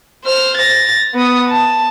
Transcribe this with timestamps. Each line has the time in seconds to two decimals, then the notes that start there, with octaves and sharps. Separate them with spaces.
0.25 C5 F6
0.58 A6 A#6
1.15 B3 D#6
1.49 A5